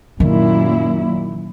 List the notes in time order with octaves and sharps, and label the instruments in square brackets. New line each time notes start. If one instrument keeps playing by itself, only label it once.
[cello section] F#2 A#2 E4 [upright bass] D#3